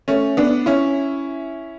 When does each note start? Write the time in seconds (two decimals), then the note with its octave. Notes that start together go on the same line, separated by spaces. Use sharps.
0.08 A3 C#4
0.37 B3 D4
0.66 C#4 E4